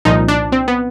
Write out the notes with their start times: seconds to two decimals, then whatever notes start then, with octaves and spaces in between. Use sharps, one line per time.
0.05 C2 A#2 F3 D#4
0.28 D4
0.52 C4
0.68 B3